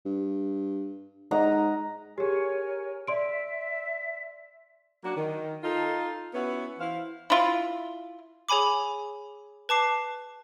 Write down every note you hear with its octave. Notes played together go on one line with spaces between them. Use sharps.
G2
G#2 D#5 F#5 A#5
G4 G#4 A#4 C#5 G#5
D5 E5 C6 D7
F#3 A#3 C#4 D4 F#4
D#3
D#4 F4 A4
B3 C#4 E4 F#4 B4 C#5
E3 E4 C5 F5
E4 F4
G#4 C#5 G#5 B5 D6
B4 A5 D6 C7